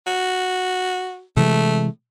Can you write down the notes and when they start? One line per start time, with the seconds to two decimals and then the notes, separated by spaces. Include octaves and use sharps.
0.07 F#4
1.37 C3 E3 G#3 A3